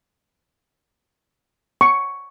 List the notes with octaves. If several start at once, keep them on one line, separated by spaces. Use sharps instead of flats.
C#6